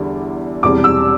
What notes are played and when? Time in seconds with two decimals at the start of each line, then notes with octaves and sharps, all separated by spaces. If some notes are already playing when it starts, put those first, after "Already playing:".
Already playing: E2 D3 G3 E4
0.63 E1 E2 C3 G3 C4 D6
0.84 E6